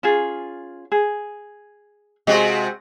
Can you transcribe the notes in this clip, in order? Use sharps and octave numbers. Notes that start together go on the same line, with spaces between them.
C#4 F4 G#4
G#4
C3 G#3 F#4 D#5 F5